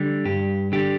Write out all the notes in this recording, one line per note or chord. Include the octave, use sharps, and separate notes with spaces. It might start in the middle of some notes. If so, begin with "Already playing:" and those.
Already playing: D3 G3
G2 G4
D3 G3 G4